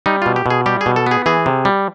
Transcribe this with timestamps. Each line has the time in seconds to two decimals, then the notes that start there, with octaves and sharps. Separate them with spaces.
0.06 G3 D#4
0.22 B2 F4
0.36 G4
0.46 B2 G#4
0.66 G3 G4
0.81 G#4
0.86 B2
0.96 A4
1.06 B3 G#4
1.26 E3 G#4
1.46 C3
1.65 G3